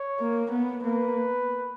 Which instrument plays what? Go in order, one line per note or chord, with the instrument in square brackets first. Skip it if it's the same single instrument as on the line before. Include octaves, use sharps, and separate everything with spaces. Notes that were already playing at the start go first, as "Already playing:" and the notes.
Already playing: [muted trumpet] C#5
[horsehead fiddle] A#3
B3
[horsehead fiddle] A#3 [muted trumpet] B4